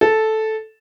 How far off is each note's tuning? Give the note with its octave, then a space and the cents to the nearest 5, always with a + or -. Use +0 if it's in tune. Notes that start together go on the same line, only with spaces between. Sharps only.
A4 -5